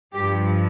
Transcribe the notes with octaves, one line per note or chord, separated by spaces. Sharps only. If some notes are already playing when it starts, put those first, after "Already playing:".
G2 F3 G4